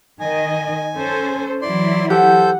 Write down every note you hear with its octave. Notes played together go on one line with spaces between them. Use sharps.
D#3 D#5 G#5
C#4 A4 C5
E3 F#3 E4 D5 C6
G4 A4 C5 F#5 G6